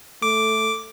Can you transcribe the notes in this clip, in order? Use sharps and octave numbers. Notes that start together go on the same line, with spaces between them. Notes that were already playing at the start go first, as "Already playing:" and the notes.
A3 D6